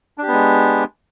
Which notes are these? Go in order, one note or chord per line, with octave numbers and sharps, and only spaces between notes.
G#3 B3 D4 G4